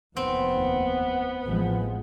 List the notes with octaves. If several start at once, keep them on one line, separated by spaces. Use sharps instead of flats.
F1 D#2 B3 C4
A1 F3 G#3